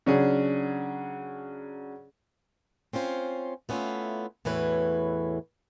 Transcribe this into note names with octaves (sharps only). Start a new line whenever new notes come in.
C#3 F#3 C#4 D4 G#4
C4 C#4 F4 C5
A3 B3 C#4 E4 F4
E2 A2 E3 F#4 B4 C#5